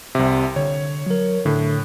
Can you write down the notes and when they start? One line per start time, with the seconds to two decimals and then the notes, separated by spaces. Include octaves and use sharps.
0.15 C2 C3 E5
0.56 D3 C#5
1.06 F#3 A#4
1.46 A2 D3